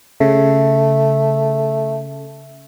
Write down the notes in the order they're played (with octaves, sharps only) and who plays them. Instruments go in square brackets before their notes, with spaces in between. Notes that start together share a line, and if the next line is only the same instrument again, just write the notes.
[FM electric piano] C#3 [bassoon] A3